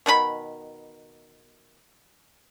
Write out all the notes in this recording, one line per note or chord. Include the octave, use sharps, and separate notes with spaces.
B2 D#3 B3 B5